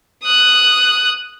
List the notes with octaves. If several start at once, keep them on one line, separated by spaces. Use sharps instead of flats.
D#6 F#6